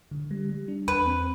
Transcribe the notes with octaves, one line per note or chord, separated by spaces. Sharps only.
D3
G3
G3
D4
E2 B4
C4